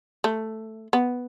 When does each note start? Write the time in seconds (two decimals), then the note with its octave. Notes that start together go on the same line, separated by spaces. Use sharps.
0.24 A3
0.93 B3